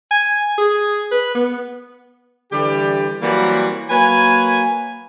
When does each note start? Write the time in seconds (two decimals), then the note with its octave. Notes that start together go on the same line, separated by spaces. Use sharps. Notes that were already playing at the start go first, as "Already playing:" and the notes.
0.11 G#5
0.58 G#4
1.11 B4
1.35 B3
2.52 D3 E3 G3 G4
3.22 E3 F#3 G3 A#3 C4 F#4
3.89 F#3 A#3 B4 G#5